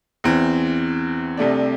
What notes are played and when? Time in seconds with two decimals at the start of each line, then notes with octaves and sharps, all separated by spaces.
0.24 E2 E3 C4
1.37 C2 C3 A3 D4